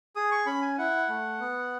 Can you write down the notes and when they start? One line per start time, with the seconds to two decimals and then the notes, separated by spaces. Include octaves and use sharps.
0.16 G#4 D#6
0.31 C#6
0.46 C#4 B5
0.61 G#5
0.78 E4 F#5
1.09 A3
1.40 B3